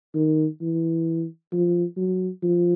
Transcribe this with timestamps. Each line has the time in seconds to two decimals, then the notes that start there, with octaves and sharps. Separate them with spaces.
0.15 D#3
0.61 E3
1.53 F3
1.97 F#3
2.43 F3